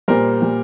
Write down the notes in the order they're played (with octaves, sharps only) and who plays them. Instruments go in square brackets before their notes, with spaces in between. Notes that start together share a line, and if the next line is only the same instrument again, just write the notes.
[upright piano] A#2 G3 A#4 C5
A#2 G3